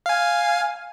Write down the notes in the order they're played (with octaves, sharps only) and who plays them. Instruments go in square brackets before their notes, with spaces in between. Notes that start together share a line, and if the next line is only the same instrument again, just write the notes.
[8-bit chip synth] F5 G#5